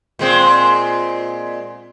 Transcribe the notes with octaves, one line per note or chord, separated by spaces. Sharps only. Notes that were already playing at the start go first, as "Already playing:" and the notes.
A#2 G#3 C4